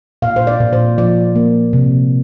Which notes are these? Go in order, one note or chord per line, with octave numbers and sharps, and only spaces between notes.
A#2 F5
C5
D5
A#2
C5
F3 D5
A#3
C3